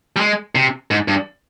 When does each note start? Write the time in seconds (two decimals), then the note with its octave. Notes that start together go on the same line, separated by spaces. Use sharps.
0.16 G3
0.20 G#3
0.55 C3
0.91 G#2
1.08 G2